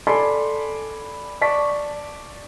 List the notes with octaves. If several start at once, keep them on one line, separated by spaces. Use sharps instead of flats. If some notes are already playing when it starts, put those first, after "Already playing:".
A4 D5 G#5 B5 C6
D5 A5 C#6 B6